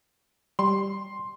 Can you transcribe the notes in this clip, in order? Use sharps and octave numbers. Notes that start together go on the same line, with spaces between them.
G3 C6